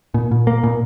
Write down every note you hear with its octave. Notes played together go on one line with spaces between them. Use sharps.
A#2
A#2
A#3
A#2